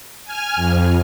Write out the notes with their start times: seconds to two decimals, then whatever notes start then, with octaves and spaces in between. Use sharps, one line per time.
0.25 G#5 F6
0.56 F2